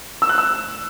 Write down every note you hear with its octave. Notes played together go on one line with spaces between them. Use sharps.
E6
F#6
E6